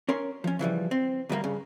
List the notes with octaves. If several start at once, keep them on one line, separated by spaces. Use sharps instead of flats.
C#4 A#4 C#5 C6
F3 C#4
C#3 E3 F3 G3
C4
D2 A#2 G3 A#3
G2 C#3